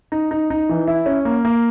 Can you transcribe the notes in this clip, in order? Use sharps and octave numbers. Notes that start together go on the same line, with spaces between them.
D#4
D#4
D#4
E3
E4
C#4
A#3
A#3